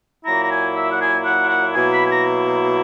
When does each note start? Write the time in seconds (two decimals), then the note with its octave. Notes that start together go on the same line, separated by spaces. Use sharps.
0.25 A#2 F#3 A#3 E4 A#5
0.42 A#5
0.51 G#5
0.75 E5
0.92 F#5
1.00 G#5
1.25 F#5
1.49 F#5
1.74 B2 F#3 A#3 E4 G#5
1.93 B5
2.06 G#5
2.11 A#5